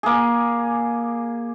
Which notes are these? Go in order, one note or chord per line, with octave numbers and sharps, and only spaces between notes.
A#3 G#4